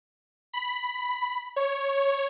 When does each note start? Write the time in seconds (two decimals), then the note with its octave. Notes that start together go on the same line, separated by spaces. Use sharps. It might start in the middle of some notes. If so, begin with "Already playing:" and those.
0.53 B5
1.56 C#5